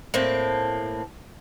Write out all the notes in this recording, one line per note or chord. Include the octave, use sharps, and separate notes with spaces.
A2 A#3 C4